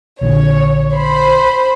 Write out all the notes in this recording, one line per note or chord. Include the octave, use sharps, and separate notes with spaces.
A#1 A#2 D3 C#5
C5 B5